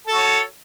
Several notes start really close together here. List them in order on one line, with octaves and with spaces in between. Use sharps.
A4 F#4 C#5